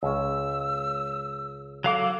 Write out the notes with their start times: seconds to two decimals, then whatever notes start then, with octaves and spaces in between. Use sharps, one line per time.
0.03 C#2 C#4 E6
1.84 F#3 A4 F5 D6